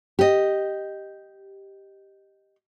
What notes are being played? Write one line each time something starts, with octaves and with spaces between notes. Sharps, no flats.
G4 D#5